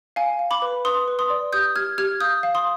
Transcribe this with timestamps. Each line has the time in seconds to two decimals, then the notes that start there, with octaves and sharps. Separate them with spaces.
0.16 F5 G#5
0.39 F5
0.51 B5 D6
0.62 B4
0.85 B4 C6 D#6
1.08 B4
1.19 C6 D#6
1.30 D5
1.53 G4 D#6 G6
1.76 G4 F6 G#6
1.98 G4 F6 G#6
2.21 F5 D#6 G6
2.43 F5
2.55 C6 D#6